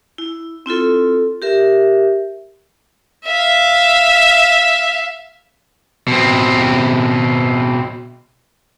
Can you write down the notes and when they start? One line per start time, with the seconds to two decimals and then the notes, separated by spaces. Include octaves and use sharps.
0.18 E4
0.66 C4 E4 F4 A4
1.42 G4 A#4 E5
3.25 E5 F5
6.08 B2 C4